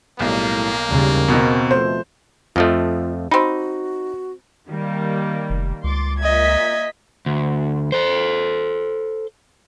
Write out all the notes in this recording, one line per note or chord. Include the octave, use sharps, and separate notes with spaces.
B1 A2 G3 A#3
A1 D#2 G#2 C#3 G3
B2 D#3 C4
B2 F3 A3 C5
F2 F3 A3 F4 D#5
C4 D#4 F#4 B5
D#3 G3 A#3
F1
C#2 C6 D6 A6
A#2 D#5 E5 G#6 B6
D2
A4 C5